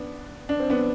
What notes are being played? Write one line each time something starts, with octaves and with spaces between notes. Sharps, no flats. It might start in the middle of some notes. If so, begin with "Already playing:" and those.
Already playing: B3 D4
D4
C4
B3 D4